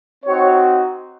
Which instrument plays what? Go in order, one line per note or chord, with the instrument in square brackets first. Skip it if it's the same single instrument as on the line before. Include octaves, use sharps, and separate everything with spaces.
[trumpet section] C4 D#4 F#4 C#5